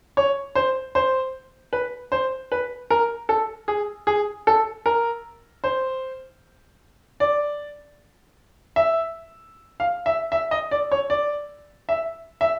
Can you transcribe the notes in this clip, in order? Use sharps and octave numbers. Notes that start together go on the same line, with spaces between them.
C#5
C5
C5
B4
C5
B4
A#4
A4
G#4
G#4
A4
A#4
C5
D5
E5
F5
E5
E5
D#5
D5
C#5
D5
E5
E5